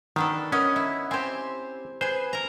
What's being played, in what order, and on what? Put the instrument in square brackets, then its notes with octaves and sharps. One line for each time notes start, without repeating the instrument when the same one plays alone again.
[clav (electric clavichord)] D#3 [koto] B3 D4 A4
[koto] B3 [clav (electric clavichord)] C#4 [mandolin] A#4 D#5 F#5
[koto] E4
[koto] C4 G4 [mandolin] C5 G#5
[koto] G#4 [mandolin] B4 G#5 [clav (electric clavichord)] C5
[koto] A#4 A#5